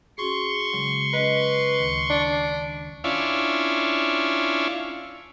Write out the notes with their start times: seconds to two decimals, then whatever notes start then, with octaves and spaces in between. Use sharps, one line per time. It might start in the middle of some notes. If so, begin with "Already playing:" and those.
0.18 C#4 F#4 G#4 C6 C#6
0.73 C#3 F#3 G#3
1.13 C#4 B4 D#5
1.78 D2 D#3
2.10 D4
3.04 C#4 D4 E4 F4